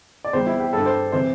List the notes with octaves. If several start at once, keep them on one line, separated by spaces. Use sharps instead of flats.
D5
E2 E3 G3 C5
E4
G4
G2 G3 A4
C5
C3 E3 C5